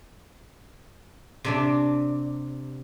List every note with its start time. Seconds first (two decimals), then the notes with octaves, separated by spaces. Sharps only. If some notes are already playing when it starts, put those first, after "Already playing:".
1.44 C3 D4 D5